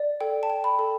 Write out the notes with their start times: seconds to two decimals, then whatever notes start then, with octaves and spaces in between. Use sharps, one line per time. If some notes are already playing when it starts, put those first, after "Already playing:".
Already playing: D5
0.21 A4 G5
0.43 A5
0.50 G5
0.64 B5
0.79 A4